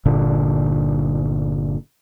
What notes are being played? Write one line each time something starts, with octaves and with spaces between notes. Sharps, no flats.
G1 A#2 D3 D4